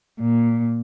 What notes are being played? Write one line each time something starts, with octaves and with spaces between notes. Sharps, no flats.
A#2